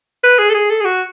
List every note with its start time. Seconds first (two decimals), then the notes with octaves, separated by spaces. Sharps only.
0.24 B4
0.39 G#4
0.49 A4
0.54 G#4
0.70 A4
0.80 G#4
0.85 F#4